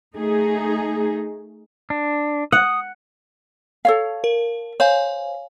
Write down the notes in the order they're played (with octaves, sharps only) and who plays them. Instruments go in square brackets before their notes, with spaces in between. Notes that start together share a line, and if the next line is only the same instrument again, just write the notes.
[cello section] A3 D#4 G#4
[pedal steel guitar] D4
[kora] F#5 [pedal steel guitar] D#6
[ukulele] A4 C#5 F5
[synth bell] A#4
[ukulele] C5 [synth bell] C#5 F5 G#5